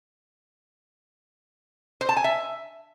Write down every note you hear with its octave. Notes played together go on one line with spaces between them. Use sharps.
C5
A5
G#5
E5